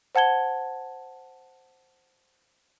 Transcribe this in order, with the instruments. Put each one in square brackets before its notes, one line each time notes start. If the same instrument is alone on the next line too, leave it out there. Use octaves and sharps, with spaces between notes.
[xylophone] C5 F#5 A5 G#6 G7